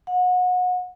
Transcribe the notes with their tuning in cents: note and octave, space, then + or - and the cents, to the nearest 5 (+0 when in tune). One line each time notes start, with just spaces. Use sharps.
F#5 -30